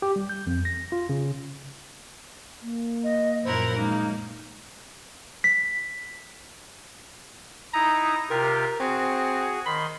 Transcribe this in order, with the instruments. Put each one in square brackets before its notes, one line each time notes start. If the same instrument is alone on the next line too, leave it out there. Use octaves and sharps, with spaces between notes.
[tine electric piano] G4
G3
G6
F2
A#6
F4
C#3
[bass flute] A#3
[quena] D#5
[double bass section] F#2 A#2 F3 [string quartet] E4 A#4 F#5 [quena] C5
[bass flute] G#3 [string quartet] A#3 [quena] D#4
[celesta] B6
[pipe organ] D#4 E4 D#6 [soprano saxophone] A#5
[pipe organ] C3 F4 G4 [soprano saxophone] A#4
[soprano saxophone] C4 [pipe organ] F#4 G#4
[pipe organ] D#3 C6 [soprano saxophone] B5